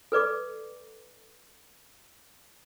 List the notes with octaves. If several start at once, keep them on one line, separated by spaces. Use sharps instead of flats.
A4 B4 D5 D6